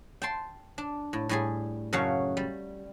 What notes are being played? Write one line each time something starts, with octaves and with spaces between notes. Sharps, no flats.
G5 A5 C6
D4
A2
A2 G3 G#4
F#2 C#3 A3 F#4 C#5 F5
G3